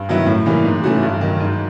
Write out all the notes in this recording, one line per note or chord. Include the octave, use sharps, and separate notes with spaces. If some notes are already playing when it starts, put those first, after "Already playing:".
Already playing: G2
D#3 F#3 B3 E4
A2
E3 G3 A#3
G#2
E3 A3 C#4 F#4
G2
D#3 F#3
G#2